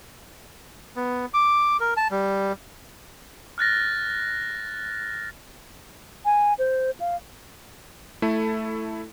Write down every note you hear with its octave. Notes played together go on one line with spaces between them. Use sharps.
B3
D6
A#4
A5
G3
F6 F#6 A6 A#6
G#5
C5
F5
A3 E4 A4